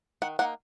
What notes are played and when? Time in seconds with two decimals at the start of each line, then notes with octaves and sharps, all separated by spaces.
0.22 D#3 F#5
0.39 A#3 D#4 F#5